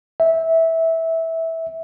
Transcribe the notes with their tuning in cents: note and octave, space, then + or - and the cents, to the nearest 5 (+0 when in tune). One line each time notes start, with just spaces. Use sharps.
E5 -15